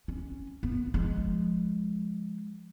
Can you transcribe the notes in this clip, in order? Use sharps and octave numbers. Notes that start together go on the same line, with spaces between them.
C#4
B3
F3 G#3